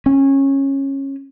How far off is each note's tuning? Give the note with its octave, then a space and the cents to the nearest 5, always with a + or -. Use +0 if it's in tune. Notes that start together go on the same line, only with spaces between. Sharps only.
C#4 -20